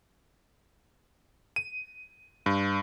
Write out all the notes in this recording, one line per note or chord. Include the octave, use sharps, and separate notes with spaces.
D#7
G2